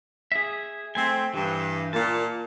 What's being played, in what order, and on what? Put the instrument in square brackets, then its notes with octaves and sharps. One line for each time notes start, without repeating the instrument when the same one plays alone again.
[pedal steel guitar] G#4 E5
[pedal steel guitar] A3 G#5 [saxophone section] C4
[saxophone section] G2 [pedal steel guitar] E3
[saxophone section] A#2 [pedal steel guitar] A5